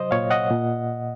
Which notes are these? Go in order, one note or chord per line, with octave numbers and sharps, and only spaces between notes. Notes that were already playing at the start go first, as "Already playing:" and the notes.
Already playing: C3 F#3 C5 D#5
A#2 C#5 F5
D#5 F#5
A#2